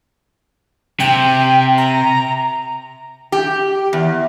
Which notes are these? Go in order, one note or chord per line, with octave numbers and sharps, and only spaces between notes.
C3 G5
A#5
G4
E2